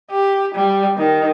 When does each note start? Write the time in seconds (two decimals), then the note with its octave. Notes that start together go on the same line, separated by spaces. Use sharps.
0.11 G4
0.55 G3
0.98 D#3